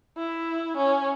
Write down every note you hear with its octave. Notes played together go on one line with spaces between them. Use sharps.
E4
C#4